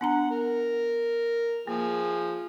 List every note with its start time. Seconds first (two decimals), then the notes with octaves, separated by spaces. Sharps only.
0.01 B3 D4 F#5 A#5
0.30 A#4
1.67 F3 A#3 G#4